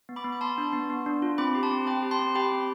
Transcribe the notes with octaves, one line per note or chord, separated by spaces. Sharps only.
B3
B5 D6
B3
B5
B3 A5 C6
D4
B3
B3
D4
F4
C4 B5 D6
G4
A5 C6
C4
C4 G5 B5
G4
A5 C6
C4
G4 G5 B5
C4